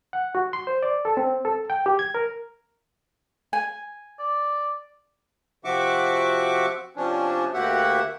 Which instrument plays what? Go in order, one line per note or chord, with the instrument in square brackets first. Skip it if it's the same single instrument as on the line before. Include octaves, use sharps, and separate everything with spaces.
[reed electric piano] F#5
F#4
C6
C5
D5
A4
C4
A4
G5
G4
G#6
A#4
[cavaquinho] G#5
[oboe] D5
[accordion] C3 F3 F#4 E5 C#6 D6
C3 F3 C#4 D4
D2 A#3 F#4 G4 E5 F#5